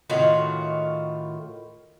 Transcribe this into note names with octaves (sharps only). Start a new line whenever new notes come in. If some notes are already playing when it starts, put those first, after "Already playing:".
A2 D#3 F4 F#4